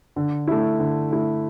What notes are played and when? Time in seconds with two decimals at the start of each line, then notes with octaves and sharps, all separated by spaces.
0.16 D3
0.47 A3 E4
0.79 D3
1.11 A3 E4